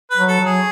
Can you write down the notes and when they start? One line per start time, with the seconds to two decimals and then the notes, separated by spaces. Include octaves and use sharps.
0.11 B4
0.17 F#3
0.28 A4
0.40 F#3
0.46 G#4